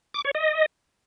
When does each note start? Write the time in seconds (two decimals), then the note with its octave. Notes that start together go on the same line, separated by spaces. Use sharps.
0.14 D6
0.25 C#5
0.35 D#5